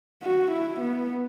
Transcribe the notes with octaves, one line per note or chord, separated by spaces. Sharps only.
F#4
E4
B3